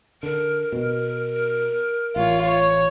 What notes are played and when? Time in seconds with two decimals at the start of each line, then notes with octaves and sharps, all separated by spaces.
0.23 D3 A#4
0.72 B2
2.16 A1 F4 C#5
2.47 C#5